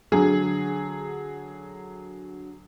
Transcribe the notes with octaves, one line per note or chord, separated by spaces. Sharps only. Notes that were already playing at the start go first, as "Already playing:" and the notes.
D3 F#3 G#4